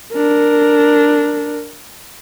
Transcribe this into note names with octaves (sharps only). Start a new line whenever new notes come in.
D4 A#4